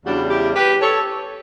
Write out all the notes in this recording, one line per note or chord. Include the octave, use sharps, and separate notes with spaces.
E2 C#3 G3 D4 F#4
E4 G4
G4 B4
A4 C#5